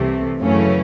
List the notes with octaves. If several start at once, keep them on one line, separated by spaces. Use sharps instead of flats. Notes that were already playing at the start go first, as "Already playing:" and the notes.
Already playing: C2 C3 E3 A3
F#2 C#3 E3 A3 C#4